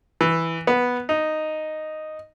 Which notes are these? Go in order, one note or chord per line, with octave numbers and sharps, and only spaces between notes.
E3
B3
D#4